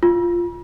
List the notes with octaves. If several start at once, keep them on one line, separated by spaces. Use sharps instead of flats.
F4